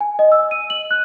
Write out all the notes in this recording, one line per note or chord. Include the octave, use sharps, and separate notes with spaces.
G#5
D#5
E6
D#7
F#7
F#6